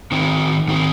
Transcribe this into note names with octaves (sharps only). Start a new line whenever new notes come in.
D#3 C4 D#4 C5
D#3 C4 D#4 C5